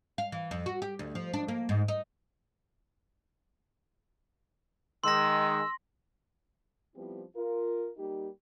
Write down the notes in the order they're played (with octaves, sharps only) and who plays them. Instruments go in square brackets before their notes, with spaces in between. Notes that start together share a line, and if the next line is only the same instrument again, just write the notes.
[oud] F5
E3
F2
F#4
G4
D2
F3
D4
A#3
G#2
D#4
[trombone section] D#3 G#3 [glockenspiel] C6 A#6 [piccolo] E6
[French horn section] F3 G3 B3 C4 E4 G4
F4 A#4
G3 A#3 D#4 G4